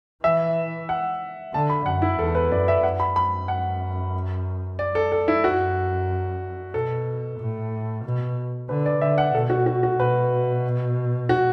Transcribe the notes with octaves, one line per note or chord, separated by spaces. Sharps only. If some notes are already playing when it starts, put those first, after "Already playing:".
E3 E5
F#5
D3 A5
B5
F#2 F#5
E4
E2 A4
B4
F#2 D5
E5
F#2 F#5
B5
B5
F#5
D5
A4
A4
E4
F#2 F#4
B2 A4
A2
B2
D3 B4
D5
D3 E5
F#5
B2 A4
F#4
F#4
F#4
B2 B4
F#4